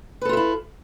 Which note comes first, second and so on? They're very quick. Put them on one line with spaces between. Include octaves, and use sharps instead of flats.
B4 A4 F4 E5 E4